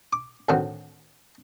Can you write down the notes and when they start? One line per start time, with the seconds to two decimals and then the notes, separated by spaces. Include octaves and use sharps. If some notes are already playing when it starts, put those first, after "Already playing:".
0.13 D6
0.49 D2 A2 D3 D#3 F#3 C4